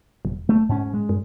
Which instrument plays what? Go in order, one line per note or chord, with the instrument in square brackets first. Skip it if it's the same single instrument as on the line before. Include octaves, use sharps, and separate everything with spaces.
[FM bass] E1
[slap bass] A3
G#2 C#4
G#3
[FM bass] G2